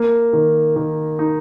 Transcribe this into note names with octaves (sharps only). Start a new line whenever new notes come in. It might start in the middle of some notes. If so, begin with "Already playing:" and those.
Already playing: A#3
D#3
D#3
D#4